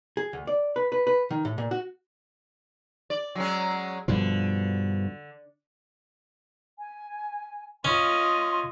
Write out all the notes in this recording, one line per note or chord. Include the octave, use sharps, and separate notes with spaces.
G#4
D2
D5
B4
B4
B4
D#3
A2
A#2
F#4
D5
F#3 G#3 C#4
G2 B2 D3 F3
G#5
C#4 F4 D#5 C6